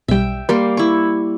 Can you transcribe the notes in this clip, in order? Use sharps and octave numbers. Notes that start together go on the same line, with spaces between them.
B1 G3 E5 G5
G3 A#3 A#4 C6
E4 C#6